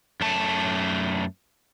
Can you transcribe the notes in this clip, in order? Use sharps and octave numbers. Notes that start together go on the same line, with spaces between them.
F#2 A3 A5